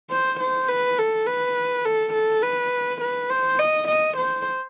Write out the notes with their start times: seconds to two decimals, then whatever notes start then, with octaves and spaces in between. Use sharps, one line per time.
0.10 C5
0.40 C5
0.68 B4
0.98 A4
1.26 B4
1.85 A4
2.13 A4
2.42 B4
3.01 B4
3.30 C5
3.59 D#5
3.88 D#5
4.17 C5